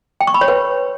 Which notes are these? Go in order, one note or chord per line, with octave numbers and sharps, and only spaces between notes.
G5
C#6
B5
C#5
B4